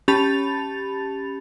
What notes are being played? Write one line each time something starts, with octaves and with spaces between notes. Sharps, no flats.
C#4 G4 A5 B5 A6 F7